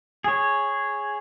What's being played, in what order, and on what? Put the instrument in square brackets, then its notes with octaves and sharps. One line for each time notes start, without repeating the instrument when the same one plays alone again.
[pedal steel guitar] G#4 C#5